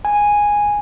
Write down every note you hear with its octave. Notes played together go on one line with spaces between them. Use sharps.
G#5